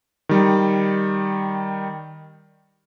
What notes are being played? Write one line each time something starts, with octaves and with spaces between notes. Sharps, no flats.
D#3 G3